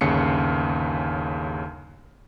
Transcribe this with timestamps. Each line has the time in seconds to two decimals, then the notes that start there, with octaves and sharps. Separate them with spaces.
0.01 G1 D#2 C#3 C7 C#7